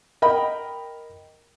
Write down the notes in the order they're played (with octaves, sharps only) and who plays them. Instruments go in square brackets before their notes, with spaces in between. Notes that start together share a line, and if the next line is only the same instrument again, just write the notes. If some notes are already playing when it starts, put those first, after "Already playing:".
[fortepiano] A#4 D#5 G5 B5